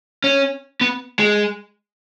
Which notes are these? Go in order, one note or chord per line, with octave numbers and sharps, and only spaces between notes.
C#4
B3
G#3